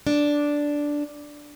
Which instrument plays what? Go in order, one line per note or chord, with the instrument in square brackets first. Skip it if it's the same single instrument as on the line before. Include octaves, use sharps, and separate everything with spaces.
[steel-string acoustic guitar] D4